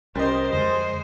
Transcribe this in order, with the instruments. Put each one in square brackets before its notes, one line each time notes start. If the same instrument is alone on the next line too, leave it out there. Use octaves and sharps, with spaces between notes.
[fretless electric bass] C2 C#4 [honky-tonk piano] G3 D#5 [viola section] G4 A#4 C5
[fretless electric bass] F2 D3 [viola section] G#3 [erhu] C5